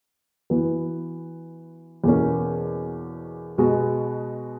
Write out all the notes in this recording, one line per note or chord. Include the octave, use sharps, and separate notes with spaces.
E3 B3 F#4 B4
E2 B2 A#3 C#4
B2 G#3 B3 F#4